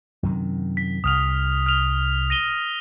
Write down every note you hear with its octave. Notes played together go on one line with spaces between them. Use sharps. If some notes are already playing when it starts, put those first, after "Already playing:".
F#2 C3 D#3
B6
C2 D#6 F6 F7
F6 F7
A#6 D#7 G7